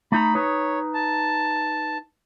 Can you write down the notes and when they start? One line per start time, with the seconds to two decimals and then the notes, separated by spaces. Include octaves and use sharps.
0.12 A3 D#4 A#5 B5
0.35 D#4 B4 C#5
0.94 A5